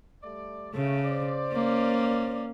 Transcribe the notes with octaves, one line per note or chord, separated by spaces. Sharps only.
G3 A3 D5
C#3 A3
C5 D5
A#3 C#4